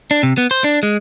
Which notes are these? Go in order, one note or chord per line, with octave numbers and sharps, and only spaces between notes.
D4
C3
B3
C5
D4
G#3